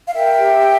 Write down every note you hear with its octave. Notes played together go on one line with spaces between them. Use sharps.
F5
A#4 E5 G5
G4